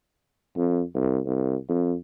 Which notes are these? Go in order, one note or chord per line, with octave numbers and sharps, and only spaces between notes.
F2
C2
C2
F2